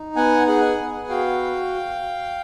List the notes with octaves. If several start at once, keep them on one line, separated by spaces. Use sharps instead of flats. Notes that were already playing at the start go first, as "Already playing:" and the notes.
Already playing: D#4
B3 F#5 G#5
G#4 F#5 G#5
B3
F#4 F5 G5